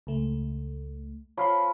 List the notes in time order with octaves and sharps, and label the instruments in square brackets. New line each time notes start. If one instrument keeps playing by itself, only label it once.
[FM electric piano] C#2 A3
[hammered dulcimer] F3 B5 [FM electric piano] C#5 F5 C6